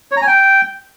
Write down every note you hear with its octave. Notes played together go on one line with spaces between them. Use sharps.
C#5
A#5
G#5
G5